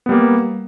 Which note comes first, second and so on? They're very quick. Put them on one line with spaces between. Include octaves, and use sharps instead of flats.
B3 G3 A#3